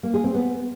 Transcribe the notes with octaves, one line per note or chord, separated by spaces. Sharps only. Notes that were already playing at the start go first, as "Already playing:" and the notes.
A#3
G#4
C4
B3